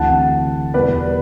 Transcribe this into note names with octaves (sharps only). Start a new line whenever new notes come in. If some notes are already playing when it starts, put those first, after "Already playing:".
Already playing: D2 C3 E3 F#5 A5
E2 B2 G3 B4 D5